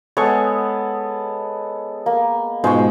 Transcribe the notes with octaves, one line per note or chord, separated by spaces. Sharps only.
G#3 B3 A4 C#5 C#6
A#3
G#2 B2 G#3 F4 C5 G5 C#6